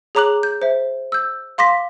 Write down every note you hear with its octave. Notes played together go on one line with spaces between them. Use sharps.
G#4 C#5 A#5 D6 F#6 F#7
G6
C5 E5
E6 G6
F5 C6 D6 A#6 B6